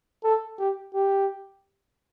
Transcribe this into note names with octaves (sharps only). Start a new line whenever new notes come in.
A4
G4
G4